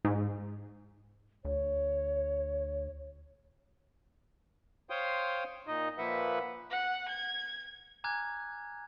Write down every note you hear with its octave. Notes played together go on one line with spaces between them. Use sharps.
G#2
D2 C#5
C5 C#5 F5 G5 C6 D#6
A#2 D#4 D#5
A#2 F3 A#3 B4 E5 F#5
F#5
G#6
G#5 A#5 D6 F6 F#6 G#6